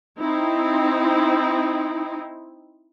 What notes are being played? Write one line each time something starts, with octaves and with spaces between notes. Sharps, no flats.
C4 D#4 E4